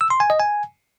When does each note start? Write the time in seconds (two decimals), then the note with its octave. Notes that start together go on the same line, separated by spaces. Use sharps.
0.01 E6
0.10 C6
0.20 G#5
0.30 D#5
0.40 G#5